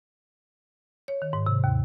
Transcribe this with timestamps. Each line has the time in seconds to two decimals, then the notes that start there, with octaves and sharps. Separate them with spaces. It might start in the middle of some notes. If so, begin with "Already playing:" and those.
1.08 C#5
1.22 D#3
1.33 G#2
1.46 C3
1.64 D#2